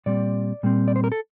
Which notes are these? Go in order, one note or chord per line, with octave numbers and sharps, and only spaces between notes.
A#2 G3 C4 D5
A#2 G3 C4
D5
C5
A#4
A4